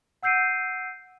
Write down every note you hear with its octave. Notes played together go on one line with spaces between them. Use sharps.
F#5 E6 G6 C7 D7 D#7